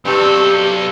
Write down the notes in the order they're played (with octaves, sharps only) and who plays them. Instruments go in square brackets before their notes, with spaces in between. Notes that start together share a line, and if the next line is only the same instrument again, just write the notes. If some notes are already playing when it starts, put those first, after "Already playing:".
[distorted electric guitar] B1 A4 [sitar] G2 [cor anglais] C4 [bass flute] G4